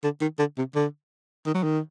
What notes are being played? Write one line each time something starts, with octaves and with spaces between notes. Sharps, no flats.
D3
D#3
D3
C3
D3
D#3
F#3
D#3